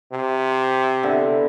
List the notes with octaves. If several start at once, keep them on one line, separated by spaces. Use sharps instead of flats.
C3
D3 B3 E4